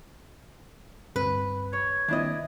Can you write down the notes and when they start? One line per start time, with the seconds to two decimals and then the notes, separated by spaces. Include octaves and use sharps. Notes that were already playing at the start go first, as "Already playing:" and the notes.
1.16 D2 G2 C4 B4
1.73 C#5 G#6
2.08 D#3 A#3 C4 D4 E4 D#5